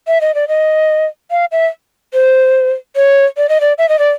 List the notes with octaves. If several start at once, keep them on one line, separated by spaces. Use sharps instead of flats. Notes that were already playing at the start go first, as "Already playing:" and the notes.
E5
D#5
D5
D#5
F5
E5
C5
C#5
D5
D#5
D5
E5
D#5
D5